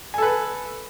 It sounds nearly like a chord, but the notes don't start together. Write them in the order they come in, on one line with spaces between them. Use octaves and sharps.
G#5 A4 B4